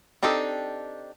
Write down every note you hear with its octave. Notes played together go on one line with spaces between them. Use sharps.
C4 D4 D#4 G4 A4